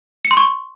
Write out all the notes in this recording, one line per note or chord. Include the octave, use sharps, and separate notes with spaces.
C#7
C6
C#6